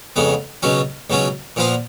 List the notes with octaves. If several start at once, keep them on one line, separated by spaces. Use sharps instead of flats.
F2 C#3 G#3 B3
C#2 B2 F#3 C#4
C#2 B2 F#3 C#4
A#2 F3 B3 F4